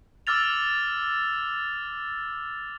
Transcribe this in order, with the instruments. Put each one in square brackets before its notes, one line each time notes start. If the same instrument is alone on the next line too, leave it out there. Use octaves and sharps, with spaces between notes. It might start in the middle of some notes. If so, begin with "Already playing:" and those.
[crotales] D6 E6 F6 A6 F7